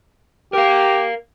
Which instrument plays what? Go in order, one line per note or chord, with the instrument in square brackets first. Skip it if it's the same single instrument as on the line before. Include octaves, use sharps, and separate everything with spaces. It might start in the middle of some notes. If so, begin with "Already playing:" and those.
[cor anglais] G4 [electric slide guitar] A#4 F5